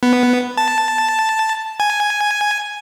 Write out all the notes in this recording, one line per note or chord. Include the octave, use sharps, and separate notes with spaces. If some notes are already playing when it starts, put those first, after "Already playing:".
B3
A5
G#5